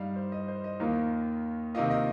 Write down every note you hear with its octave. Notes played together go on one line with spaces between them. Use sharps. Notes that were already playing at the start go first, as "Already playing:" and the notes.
Already playing: G2 G3 D#4 F5
C5
D#5
C5
D#5
D#2 D#3 A#3 F4
C3 D#3 A#3 F4 D#5
D#5